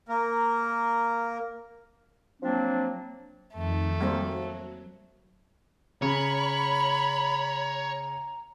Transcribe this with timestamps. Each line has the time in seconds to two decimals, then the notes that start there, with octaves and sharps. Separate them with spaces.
0.09 A#3 A#4
2.41 F3 F#3 A#3 C4 D4
3.53 F2 D#3 A3
4.00 F#3 G3 A#3 C4
6.02 C#3 C#5 A#5 B5